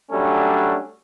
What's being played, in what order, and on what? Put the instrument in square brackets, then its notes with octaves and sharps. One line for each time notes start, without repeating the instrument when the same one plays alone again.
[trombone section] F#3 G3 A3 C#4 D4 A4